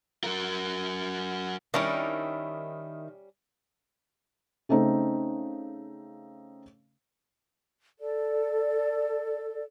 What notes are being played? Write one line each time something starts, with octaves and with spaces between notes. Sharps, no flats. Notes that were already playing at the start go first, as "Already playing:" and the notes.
F#3 A#4
D#3 G3 C#4 D4 E4
C#3 A3 C4 D#4
A4 D5